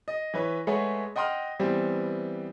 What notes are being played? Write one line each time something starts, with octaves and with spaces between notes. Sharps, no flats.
D#5
E3 B4 C#5
G#3 A3 G#4 B4 C#5 F#5
D#5 F#5 G5 C6 D#6 F6
E3 G3 B3 C4